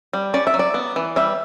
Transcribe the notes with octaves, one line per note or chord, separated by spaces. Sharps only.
G3
C#4 D5
E5
F#3
D5
B3
E3
G3 E5